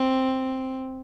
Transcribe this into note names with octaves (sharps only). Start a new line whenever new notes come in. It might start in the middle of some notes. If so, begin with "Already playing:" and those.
Already playing: C4